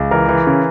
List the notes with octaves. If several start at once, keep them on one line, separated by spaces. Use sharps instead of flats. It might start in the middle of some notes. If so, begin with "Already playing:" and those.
Already playing: C#2
E3 A#4
E3
C#3